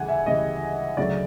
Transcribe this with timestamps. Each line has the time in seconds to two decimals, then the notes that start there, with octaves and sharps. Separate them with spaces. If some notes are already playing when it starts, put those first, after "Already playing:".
Already playing: D2 C#3 E3 G3 F#5 G#5
0.09 E5
0.26 D2 C#3 E3 G3 D#5
0.97 D2 C#3 F#3 A3 D5